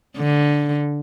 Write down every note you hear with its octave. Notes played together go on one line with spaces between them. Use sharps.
D3